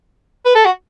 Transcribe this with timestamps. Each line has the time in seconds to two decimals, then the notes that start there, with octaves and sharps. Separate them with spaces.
0.46 B4
0.55 A4
0.65 F#4